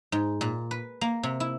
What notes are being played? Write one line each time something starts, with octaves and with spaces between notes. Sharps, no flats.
G#2
A#2
B4
A#3
C3
E4